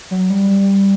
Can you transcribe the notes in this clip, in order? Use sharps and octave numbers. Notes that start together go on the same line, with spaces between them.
F#3
G3